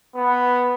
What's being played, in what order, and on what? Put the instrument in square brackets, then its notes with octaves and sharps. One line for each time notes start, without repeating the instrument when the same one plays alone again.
[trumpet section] B3